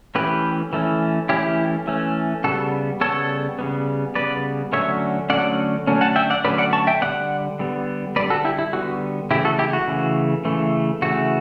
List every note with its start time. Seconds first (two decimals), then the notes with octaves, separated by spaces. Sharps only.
0.15 E3 A3 C#4 G4 B4
0.73 E3 A3 C#4
1.29 E3 A3 C#4 E4 G4
1.87 E3 A3 C#4
2.44 C#3 G3 B3 F#4 A4
3.01 C#3 G3 B3 A4 C#5
3.59 C#3 G3 B3
4.15 C#3 G3 B3 B4 D5
4.73 D3 F#3 A3 C#4 C#5 E5
5.30 D3 F#3 A3 C#4 D5 F#5
5.87 D3 F#3 A3 C#4
6.01 F#5 A5
6.16 E5 G5
6.30 D5 F#5
6.44 D3 F#3 A3 C#4 B4 D5
6.58 D5 F#5
6.73 A5 C#6
6.87 E5 G5
7.02 D3 G3 B3 D5 F#5
7.59 D3 G3 B3
8.16 D3 G3 B3 B4 D5
8.30 F#4 A4
8.45 E4 G4
8.59 E4
8.73 D3 G3 B3 F#4
9.31 C#3 E3 A3 E4 G4
9.45 F#4 A4
9.59 E4 G4
9.73 F#4
9.88 C#3 E3 A3
10.45 C#3 E3 A3
11.02 C#3 E3 A3 F#4